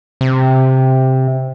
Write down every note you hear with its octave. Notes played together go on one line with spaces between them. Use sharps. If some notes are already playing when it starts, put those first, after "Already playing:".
C3